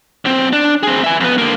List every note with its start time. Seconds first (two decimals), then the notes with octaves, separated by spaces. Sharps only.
0.25 B1 C4
0.53 D4
0.83 C4 G#4
1.04 E5 G#5
1.20 F2 B3
1.38 D3 A#3